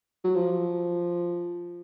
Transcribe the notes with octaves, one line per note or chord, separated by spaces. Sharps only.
F#3
F3